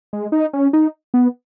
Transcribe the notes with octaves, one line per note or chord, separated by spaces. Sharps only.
G#3
D#4
C#4
D#4
B3